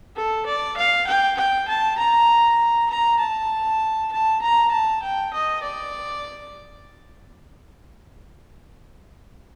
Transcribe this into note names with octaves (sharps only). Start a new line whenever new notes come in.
A4
D5
F5
G5
G5
A5
A#5
A#5
A5
A5
A#5
A5
G5
D#5
D5